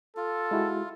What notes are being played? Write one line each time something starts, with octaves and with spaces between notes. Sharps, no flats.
F4 A4
G#3 E4 F#4